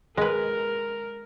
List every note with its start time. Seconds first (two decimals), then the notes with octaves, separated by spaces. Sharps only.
0.17 G#3 A#4 B4